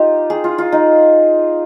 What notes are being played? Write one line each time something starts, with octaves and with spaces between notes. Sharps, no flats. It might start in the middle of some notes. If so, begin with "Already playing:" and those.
Already playing: D#4 F4 G4
G#4
F4
F4
D#4